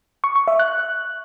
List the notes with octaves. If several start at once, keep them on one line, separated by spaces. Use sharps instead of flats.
C#6
C#6
E5
F#6